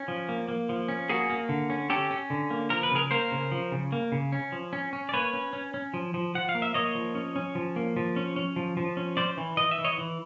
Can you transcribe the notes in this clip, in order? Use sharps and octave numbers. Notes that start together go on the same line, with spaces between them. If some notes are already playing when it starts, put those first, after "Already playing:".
Already playing: C#4
F3
A#3
A#3
F3
C#4
A#3 F#4 G#4
A#3
D3
C#4
C#4 G4 A4
C#4
D3
A#3
F3 A#4
B4
C#3 G#4 A#4
A#3 A#4 C5
C#3
F3
C#3
A#3
C#3
C#4
F3
C#4
C#4
D5
A#3 B4 C#5
C#4
C#4
C#4
F3
F3
F3 F#5
F5
A#3
E5
A#3 C#5 D#5
F3
C#4
C#4
F3
A#3
F3
C#4
C#4
F3
F3
C#4
C#4 C5 D5
E3
E3 D#5
E5
E3
C#5 D#5
E3